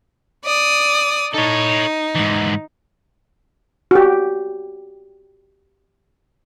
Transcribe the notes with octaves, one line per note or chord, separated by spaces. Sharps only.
D5 D#6
D#4 A4 C#5
G#2 E3
F#4 G4